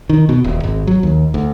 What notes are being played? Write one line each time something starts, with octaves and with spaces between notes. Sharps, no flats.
D#3
B2
D#1
G#1
F#3
D#2
D2